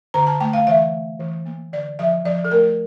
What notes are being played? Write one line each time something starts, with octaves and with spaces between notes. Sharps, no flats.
D3 A#5
A5
A3 G5
F5
E3 E5
A3
E3
A#3
D3 D5
F3 E5
F3 D5
A4
A3 A#4